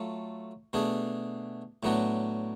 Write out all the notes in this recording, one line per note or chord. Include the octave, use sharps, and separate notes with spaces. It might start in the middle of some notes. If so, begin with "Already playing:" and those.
Already playing: F#3 A3 F4 A4
B2 A3 D4 G#4
A2 F#3 B3 D4 F#4